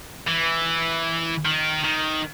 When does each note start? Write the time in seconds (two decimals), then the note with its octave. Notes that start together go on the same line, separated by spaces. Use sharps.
0.28 E3
1.45 D#3
1.84 D#3